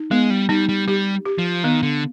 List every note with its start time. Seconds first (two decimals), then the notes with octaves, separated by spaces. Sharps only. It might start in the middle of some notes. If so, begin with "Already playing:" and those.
Already playing: D#4
0.11 G#3 B3
0.30 G3
0.49 G3 D#4
0.69 G3
0.88 G3 G4
1.26 G4
1.38 F3
1.64 D#3 B3
1.83 D3